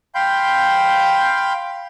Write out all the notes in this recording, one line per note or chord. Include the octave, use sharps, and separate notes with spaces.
F5 G5 B5 C6 G6